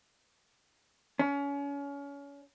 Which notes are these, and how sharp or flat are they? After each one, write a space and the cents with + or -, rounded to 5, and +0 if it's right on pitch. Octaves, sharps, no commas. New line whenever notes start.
C#4 +30